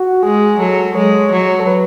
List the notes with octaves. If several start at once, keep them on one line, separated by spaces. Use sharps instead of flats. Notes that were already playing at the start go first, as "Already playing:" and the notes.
Already playing: F#4
G#3 G#4
F#3 A4
G#3 C#5
F#3
A4
B4